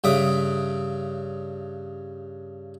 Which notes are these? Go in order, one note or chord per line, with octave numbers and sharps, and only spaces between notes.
G2 C#3 E5 D6 D#6